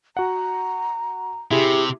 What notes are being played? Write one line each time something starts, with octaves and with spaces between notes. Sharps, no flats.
F#4 F#5 A#5
C3 E4 G4 G#4